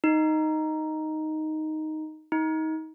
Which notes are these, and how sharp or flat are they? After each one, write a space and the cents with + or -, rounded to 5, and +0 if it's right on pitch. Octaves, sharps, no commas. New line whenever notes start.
D#4 +0
D#4 +25